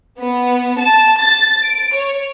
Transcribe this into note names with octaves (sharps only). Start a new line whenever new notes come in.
B3
A5
A6
D7
C#5